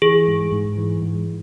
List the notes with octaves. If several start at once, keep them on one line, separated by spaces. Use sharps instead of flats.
E3 G#4
G#2
G#2
E3
G#2